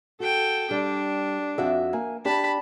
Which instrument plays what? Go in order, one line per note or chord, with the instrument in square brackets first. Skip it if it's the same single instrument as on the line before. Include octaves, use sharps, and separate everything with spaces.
[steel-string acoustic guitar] F#4 [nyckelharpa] A4 G5
[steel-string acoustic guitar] G3 [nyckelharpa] D4
[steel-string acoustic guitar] F2 F#4 E5
A#3 G#5
[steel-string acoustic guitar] D4 G4 [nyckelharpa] A5 B5